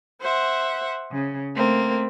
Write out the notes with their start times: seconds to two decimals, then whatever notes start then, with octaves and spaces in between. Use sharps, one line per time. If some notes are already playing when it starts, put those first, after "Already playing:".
0.20 C5 E5 F#5
1.10 C#3
1.55 A3 A#3 C4